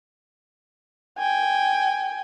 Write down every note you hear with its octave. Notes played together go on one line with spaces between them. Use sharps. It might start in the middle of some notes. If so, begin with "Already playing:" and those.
G5 G#5